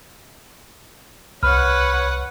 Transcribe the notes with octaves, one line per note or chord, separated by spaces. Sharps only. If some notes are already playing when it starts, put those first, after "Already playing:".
C2 B4 C#5 F#5 B5 F6